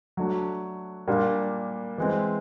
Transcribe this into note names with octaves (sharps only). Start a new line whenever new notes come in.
F#3 A3 D4 F#4
A#2 G3 A#3 D4
E3 G#3 C4